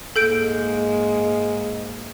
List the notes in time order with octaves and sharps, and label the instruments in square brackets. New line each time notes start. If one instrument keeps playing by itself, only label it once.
[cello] G#2 A#3 [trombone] G#3 [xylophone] A4 G6 D7